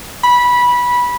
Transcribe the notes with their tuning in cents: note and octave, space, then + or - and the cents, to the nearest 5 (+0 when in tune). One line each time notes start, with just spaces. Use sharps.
B5 -15